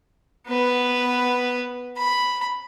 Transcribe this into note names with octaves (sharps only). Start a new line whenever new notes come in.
B3 B4
B5